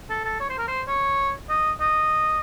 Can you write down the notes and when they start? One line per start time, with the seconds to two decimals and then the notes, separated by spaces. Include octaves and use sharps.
0.10 A4
0.25 A4
0.40 C#5
0.50 C5
0.58 A#4
0.68 C5
0.88 C#5
1.50 D#5
1.81 D#5